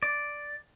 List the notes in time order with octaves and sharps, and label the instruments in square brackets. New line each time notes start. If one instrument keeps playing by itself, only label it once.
[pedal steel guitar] D5